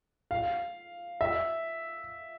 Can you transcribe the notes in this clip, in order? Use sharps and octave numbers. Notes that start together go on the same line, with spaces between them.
F5
E5